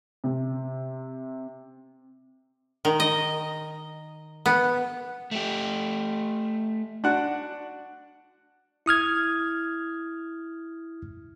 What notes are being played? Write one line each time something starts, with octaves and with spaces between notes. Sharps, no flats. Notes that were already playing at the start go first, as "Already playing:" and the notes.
C3
D#3
D#5
B3
A3 G4
D4 F#4 F#5
E4 D#6 F6 G#6